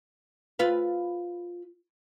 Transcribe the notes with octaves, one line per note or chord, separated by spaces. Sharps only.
F4 B4